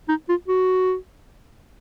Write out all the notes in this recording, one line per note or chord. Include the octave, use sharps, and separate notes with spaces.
D#4
F4
F#4